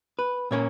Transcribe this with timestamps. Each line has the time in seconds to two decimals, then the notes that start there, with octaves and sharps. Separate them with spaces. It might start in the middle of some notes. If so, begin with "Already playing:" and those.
0.19 B4
0.51 A#2 A#3 C#4 C#5